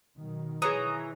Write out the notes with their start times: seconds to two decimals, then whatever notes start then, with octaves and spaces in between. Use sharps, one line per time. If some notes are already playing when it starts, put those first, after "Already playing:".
0.18 B2 D#3 F#3
0.62 E3 G#4 C#5 A#5 D#6